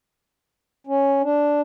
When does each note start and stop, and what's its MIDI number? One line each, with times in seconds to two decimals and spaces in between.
0.87 1.22 61
1.23 1.61 62